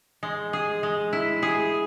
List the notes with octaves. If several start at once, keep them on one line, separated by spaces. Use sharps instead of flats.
G#3
G#4
G#3
E4
G#4